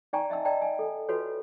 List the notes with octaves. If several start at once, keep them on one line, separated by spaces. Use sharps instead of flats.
D#4 D5 G5 G#5 A#5 C#6
D#5 E5 A5 E6
D5 D#5 G5 A5 A#5
G#5
A4
F4 F#4 A4 B4 C#5